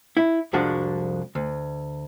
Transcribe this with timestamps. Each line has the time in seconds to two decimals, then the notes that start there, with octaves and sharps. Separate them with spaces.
0.17 E4
0.53 C2 F2 F3 G#3 D4 F#4
1.35 D2